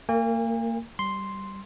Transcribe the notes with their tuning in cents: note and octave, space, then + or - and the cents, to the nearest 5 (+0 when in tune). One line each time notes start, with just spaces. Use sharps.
A#3 -30 A#4 +0 G#5 -45
G3 -10 C6 +0